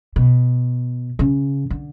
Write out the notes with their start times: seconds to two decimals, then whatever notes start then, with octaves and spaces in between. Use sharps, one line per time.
0.16 B2
1.19 C#3
1.70 D3